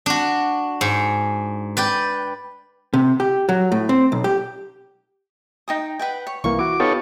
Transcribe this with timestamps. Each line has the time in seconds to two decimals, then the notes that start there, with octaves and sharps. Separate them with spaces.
0.06 D4 F#4
0.81 G#2
1.77 B4 D5 G5
2.94 C3
3.20 G4
3.49 F#3
3.72 A2
3.89 C4
4.12 B1
4.24 G4
5.68 D#4 G5 D#6
5.99 B4 F#5 G5
6.27 C#5
6.44 C2 E3 A#3 C#6
6.59 E4 F#4 D6
6.80 B3 D#4 F4 G4 A4 C#5